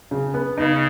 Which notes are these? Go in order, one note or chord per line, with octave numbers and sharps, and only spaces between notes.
C#3
B3
C#3 D#4